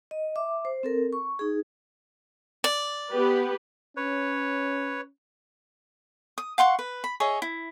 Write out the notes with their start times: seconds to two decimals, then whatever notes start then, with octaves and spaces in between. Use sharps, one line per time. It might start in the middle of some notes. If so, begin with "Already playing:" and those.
0.11 D#5
0.36 E5 D6
0.65 C5
0.83 C4 A4 A#4
1.13 C#6
1.39 D#4 G#4
2.64 D5
3.11 B3 G4 B4
3.96 C#4 B4 C#5
6.38 D#6
6.58 F5 F#5 C6 C#6
6.79 B4
7.04 B5
7.20 G#4 C#5 D#5 E5
7.42 E4